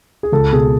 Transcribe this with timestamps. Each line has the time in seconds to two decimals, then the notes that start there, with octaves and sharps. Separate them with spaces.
0.23 G#4
0.32 C#2 A4
0.52 B2 G#4